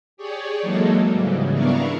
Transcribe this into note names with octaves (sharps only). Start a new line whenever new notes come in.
G4 G#4 C#5 D5
E3 F#3 G#3 A#3 D#4 A4
G#2 C#3 E3 F#3 G3
B3 D4 E4 A#4 F5 C#6